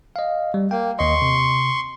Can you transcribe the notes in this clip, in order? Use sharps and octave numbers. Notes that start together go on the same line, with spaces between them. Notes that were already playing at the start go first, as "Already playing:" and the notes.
D#5 F5
G3
A#3 G5
D#2 D#5 C6 C#6
C3